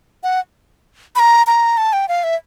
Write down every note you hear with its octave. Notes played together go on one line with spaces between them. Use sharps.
F#5
B5
A#5
A#5
A5
G5
F5
E5